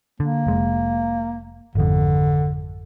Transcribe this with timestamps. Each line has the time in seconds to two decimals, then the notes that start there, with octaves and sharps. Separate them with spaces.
0.20 D3 A#3
0.47 F1 G#3
1.75 G#1 F2 D3